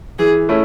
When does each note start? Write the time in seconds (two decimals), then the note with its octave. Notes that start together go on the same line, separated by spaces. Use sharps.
0.19 E3 G#4
0.49 A3 C#4 E4